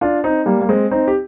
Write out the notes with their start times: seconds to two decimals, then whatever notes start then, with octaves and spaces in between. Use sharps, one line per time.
0.01 D4 F4
0.24 C4 D#4
0.46 G3 A#3
0.61 A#3
0.69 G#3 C4
0.91 C4 D#4
1.08 G4